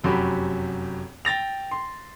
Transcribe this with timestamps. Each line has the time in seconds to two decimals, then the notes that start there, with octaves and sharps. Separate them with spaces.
0.04 F1 F#2 F#4 G4 B5
1.25 G5 A6 A#6 F7
1.71 C6